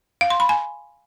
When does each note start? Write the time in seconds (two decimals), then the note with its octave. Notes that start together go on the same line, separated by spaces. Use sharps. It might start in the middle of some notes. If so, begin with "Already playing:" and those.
0.21 F5
0.30 C6
0.40 B5
0.49 G#5